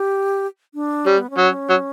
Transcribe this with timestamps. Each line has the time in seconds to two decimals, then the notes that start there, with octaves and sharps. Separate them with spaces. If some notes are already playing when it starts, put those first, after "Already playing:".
Already playing: G4
0.74 D4
1.06 G3 C#4
1.18 B3
1.30 C#4
1.38 F#3
1.70 F#3